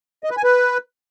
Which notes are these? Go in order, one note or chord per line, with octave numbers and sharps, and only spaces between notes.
D#5
B4
G#5
B4